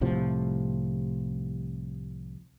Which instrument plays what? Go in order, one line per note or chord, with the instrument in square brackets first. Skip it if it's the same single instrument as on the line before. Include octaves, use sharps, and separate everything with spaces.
[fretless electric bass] C2 A2 C3 F3